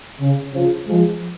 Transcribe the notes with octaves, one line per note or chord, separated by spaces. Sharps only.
C#3
C#3 F3
F3 G#3